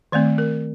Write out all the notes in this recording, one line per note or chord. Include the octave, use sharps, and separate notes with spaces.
D#3 A3 C4 D5
A#4